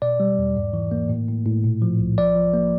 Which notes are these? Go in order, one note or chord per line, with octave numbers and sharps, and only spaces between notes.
B2 D5
G3
E2
G#2
E3
A#3
A2
A2
A2
A#2
F3
C2
F3 D5
F3
A#3